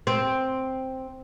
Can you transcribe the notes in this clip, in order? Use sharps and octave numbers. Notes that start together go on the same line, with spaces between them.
C4